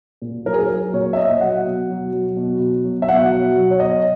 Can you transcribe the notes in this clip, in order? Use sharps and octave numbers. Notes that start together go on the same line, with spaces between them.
A#2
F#3 A#4
G#4
A#4
F#3
A#2 C#5
E5
A#2 D#5
F#3 F#5
B2
F#3
F#3
B2
B2
F#3
E5
B2 F#5
F#3
F#3
C#5
B2 D#5